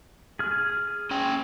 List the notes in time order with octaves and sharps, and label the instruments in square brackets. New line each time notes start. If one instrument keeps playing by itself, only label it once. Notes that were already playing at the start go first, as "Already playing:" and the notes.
[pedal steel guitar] G#4 F6
[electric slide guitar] C#4 G5